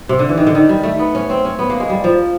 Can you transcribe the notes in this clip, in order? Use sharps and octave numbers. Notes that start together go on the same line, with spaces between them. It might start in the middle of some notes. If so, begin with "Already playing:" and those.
C3
D3
E3
D#3
D3
D#3
G3
A3
B3
C#4
C4
C#4
B3
A#3
G#3
G3
F3